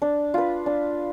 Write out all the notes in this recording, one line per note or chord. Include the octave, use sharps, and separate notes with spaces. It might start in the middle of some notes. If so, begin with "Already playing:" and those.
D4
F4 B4
D4